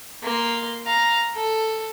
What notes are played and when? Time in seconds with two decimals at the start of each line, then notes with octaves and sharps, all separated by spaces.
0.23 A#3 C6
0.85 F5 A#5
1.36 A4